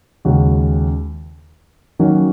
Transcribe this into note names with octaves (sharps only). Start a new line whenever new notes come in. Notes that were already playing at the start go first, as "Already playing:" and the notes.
D#2 C#3 G#3 F#4
D#3 F#3 A#3 C#4 F#4